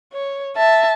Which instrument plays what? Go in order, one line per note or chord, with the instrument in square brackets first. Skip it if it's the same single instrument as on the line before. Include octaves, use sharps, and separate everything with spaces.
[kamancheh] C#5
E5 A5